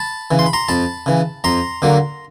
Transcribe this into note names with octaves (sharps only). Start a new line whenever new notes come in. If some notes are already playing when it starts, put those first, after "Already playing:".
Already playing: A5 B5
C#3 E3
C6
B5
A#5 C6
F2 A5 B5
C#3 E3
F2 A#5 C6
D3 F#3 A#3